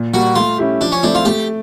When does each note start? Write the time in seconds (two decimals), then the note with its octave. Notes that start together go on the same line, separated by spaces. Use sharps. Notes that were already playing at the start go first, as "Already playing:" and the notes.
Already playing: A#2
0.13 G3 A#3 F#4
0.35 A3 F4
0.58 C#4 E4 G4
0.81 F3 D4
0.92 C#4
1.03 A3 C4 D4 E4
1.15 F4
1.25 A3 G4